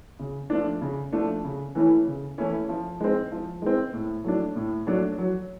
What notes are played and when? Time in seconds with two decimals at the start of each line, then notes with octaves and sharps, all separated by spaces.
0.19 C#3
0.50 F3 A3 D4
0.81 C#3
1.12 F3 A3 D4
1.44 C#3
1.75 E3 A3 C#4 E4
2.07 C#3
2.38 E3 A3 C#4 E4
2.69 F3
3.01 G#3 C4
3.32 F3
3.62 G#3 C4
3.93 A2
4.24 F#3 A3 D4
4.56 A2
4.87 F#3 A3 D4
5.18 F#3